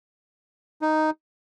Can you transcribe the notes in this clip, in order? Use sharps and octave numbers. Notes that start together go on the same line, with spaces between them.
D#4